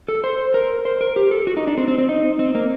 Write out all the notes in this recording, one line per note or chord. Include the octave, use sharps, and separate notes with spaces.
A4
C5
A#4
C5
A#4
G4
A4
F#4
D#4
D4
C4
C4
C4
D#4
C4
A#3